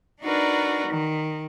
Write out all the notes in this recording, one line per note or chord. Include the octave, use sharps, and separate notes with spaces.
D4 D#4 F#4 A#4 B4 D5
D#3